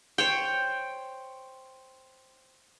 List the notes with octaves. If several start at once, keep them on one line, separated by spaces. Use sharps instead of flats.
C5 C#5 G5